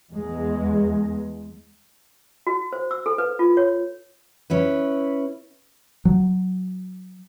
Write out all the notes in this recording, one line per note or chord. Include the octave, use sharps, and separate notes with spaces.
E2 G#3
F#4
C5
E6
A4
B4
F4
C#5
C#4 E4 B4
F#3